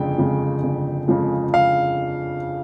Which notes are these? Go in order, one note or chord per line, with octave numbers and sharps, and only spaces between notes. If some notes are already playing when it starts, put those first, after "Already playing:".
Already playing: G1 F2 C#3 F3 G#3 G5
F2 C#3 F3 G#3
G1
F2 C#3 F3 G#3
F5